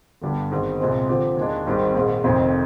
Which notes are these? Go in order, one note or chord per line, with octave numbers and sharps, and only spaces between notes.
G1 G2 D3 G3 D4
G#1 G#2 D#3
C2 A#2 G#3 C4
D3 F3 C4 G4 C5
D#2 D#3 G#3 D4
G#1 G#2 D#3 G3 C4
A#1 G#2 D#3
F1 F2 D#3